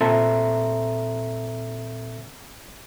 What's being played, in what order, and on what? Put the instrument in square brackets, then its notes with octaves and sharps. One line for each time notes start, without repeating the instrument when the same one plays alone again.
[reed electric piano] A#2 C4 A4 E5 A#5 C6